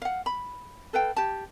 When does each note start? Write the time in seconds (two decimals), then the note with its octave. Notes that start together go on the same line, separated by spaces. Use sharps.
0.02 F5 F#5
0.26 B5
0.93 A4 B4 F5 G5
1.16 G4 A5